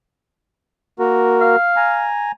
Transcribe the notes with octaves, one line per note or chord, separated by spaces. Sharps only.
A#3 F#4 A#4
F5
G#5 A#5